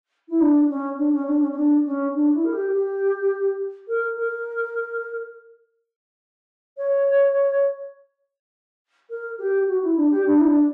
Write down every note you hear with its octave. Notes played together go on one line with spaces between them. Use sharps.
E4
D4
C#4
D4
C#4
D4
C#4
C#4
D4
C#4
D4
E4
A#4
G4
G4
A#4
A#4
C#5
A#4
G4
F#4
E4
D4
G4
D4
E4
D4